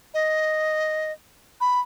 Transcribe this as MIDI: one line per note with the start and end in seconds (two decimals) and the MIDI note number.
0.14 1.12 75
1.61 1.80 83